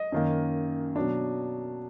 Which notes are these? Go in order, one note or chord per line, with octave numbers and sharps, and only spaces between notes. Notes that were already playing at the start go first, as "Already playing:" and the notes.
Already playing: D#5
F#2 D#3 A#3
B2 F#3 D4